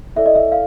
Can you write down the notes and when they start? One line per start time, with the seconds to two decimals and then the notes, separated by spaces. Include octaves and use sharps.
0.16 E4 A4 D5 E5
0.26 D#5
0.35 E5
0.52 F5